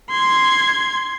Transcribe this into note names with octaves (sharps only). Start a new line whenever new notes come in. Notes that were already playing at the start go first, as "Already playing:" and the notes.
C6 G#6